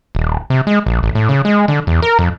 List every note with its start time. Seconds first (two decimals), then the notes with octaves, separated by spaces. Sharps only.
0.15 D#1
0.50 C3
0.67 G#3
0.86 A#1
1.03 A1
1.15 A2
1.29 C#3
1.45 G#3
1.68 D3
1.87 E2
2.02 A#4
2.19 F2